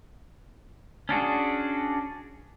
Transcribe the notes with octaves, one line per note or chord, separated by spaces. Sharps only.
C#4 D4 F#4 G#4